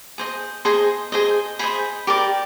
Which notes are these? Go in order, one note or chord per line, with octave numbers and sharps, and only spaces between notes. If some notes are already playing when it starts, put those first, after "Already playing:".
G#4 C5 D#5
G#4 C5 D#5 C6
G#4 C5 D#5
G#4 C5 D#5 B5
G4 A#4 D5